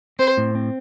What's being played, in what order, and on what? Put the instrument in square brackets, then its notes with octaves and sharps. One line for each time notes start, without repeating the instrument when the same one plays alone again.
[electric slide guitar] C4 [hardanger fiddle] C5
[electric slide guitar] A2
C4